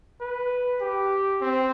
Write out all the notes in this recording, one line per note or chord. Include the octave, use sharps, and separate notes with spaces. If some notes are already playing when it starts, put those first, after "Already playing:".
B4
G4
C4